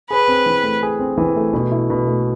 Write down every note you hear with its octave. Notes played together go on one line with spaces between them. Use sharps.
G#4 B4
C4
E3
A3
G#4
C4
E3
A3
B2
E4
B2
A3